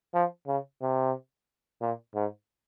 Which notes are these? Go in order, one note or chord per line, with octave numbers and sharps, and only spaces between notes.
F3
C#3
C3
A#2
G#2